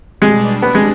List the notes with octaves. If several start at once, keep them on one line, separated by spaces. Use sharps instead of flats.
B2 G3 G#3 D4
B3
G#3